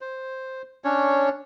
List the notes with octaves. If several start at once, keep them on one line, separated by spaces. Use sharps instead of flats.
C5
C#4 D4 C#5